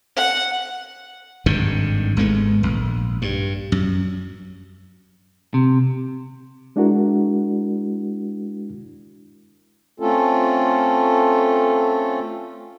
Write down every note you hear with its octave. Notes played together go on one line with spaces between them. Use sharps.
F#5
G#1 G2 D3 D#3
G#1 G#3 A3 B3
A#1
G2
F#2
C3
G#3 D4 E4 F#4 A#4
A3 C4 C#4 F4 A4